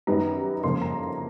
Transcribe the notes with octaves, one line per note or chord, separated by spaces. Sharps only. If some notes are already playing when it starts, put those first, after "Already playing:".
F#2 D#3 G3 B3 A#5
F2 C#3 F3 A#3 C6
A#5